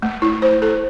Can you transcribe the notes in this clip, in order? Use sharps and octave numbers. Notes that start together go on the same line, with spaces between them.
A3
E4
C5
A4